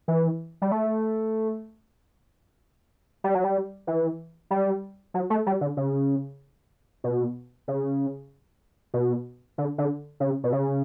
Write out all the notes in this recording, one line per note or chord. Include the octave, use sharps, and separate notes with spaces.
E3
G3
A3
G3
F#3
G3
E3
G3
F#3
A3
G3
D3
C#3
B2
C#3
B2
D3
D3
C#3
B2
C#3